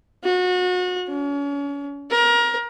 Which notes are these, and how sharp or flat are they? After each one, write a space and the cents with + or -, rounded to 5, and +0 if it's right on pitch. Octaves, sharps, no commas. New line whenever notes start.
F#4 -30
C#4 +35
A#4 +25